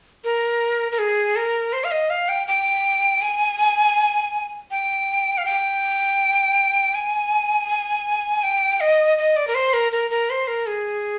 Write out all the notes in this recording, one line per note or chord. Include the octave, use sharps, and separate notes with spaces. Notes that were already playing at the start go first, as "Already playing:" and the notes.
A#4
A#4
G#4
A#4
C5
F5
D#5
F5
G5
G5
G#5
G5
F5
G5
G#5
G5
D#5
D#5
D5
A#4
C5
A#4
A#4
A#4
C5
A#4
G#4